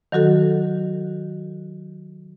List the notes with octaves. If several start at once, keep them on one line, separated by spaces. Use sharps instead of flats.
D#3 F#3 F#4 A4